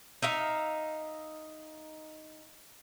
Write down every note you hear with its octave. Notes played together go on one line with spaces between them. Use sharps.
D#4 E5 F5